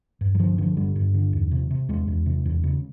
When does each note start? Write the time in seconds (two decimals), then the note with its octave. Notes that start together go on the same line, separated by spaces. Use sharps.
0.21 G2
0.35 F#3
0.39 D3 F3
0.58 D3 F3
0.76 G2 G3
0.96 G2
1.14 D3
1.33 E2
1.51 C3
1.71 C3
1.88 E2 G#3
2.08 E2
2.26 C3
2.46 E2
2.63 C#3